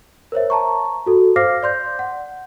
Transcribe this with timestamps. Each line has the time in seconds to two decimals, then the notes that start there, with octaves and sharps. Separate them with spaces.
0.32 A#4 C5 C#5 E5
0.50 A5 A#5 C#6
1.06 F#4 A4
1.36 C5 F5 D6 F6 A#6 C7
1.63 D5 C6 G6
1.99 F#5